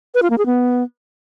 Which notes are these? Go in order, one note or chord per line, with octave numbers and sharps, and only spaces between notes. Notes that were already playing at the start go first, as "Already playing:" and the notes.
B4
F4
A#3
G#4
B3